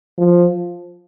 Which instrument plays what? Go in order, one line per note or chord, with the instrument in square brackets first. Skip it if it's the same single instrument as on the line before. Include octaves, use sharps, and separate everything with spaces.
[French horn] F3